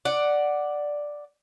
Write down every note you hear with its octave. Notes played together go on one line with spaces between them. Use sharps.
D5 F#5